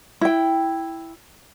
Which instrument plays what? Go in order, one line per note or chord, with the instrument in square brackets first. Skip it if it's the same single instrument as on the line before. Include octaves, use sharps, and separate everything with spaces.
[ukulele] E4 G5